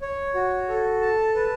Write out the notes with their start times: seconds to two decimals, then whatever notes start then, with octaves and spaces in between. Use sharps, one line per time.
0.01 C#5
0.34 F#4
0.69 A4
1.01 A5
1.35 B4